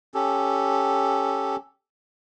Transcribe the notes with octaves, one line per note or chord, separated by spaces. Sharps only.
C#4 G4 A4